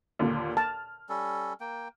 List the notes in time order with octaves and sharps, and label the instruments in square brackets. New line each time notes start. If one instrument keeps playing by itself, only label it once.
[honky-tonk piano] D#2 A#2 D3
[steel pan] A5 [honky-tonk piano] F6
[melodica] G3 C#4 A4
A#3 G5